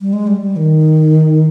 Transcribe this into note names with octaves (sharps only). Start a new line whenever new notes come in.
G3
G#3
G3
G3
D#3